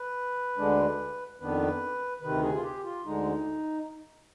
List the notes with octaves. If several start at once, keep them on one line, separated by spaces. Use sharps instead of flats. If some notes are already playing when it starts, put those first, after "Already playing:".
Already playing: B4
D2 D3 G#3 D4
F2 D#3 B3 D4 B4
D2 C3 D#3 B4
G#4
F4
G4
F4
D2 D3 G#3 D#4